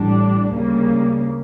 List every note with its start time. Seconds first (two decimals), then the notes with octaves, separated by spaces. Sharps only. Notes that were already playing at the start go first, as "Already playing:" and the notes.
Already playing: A1 A2 G3 D4
0.52 D2 C#3 G3 A#3